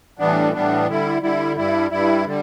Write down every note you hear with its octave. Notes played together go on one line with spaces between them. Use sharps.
A2 E3 G3 B3 D4
A2 E3 G3 B3 D4
D3 G3 E4
D3 G3 E4
G2 G3 E4
G2 G3 E4
D3 G3